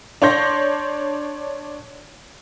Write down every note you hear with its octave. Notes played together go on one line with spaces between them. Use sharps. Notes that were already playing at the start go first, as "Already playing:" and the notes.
D4 C#5 C6 G6 A#6